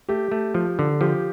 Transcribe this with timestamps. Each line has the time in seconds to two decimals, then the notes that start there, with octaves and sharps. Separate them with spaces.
0.09 A3 G4
0.32 A3
0.54 F3
0.79 D3
1.01 F3 G4